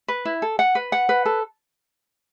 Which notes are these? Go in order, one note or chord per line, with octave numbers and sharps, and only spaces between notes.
B4
E4
A4
F#5
B4
F#5
B4
A4